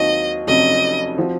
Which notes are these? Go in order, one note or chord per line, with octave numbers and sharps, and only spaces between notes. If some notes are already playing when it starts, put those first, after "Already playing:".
Already playing: D#2 D#3 F#3 C4 D#4 D#5
F1 F2 C3 F#3 C#4 D#5
F3 C4 F#4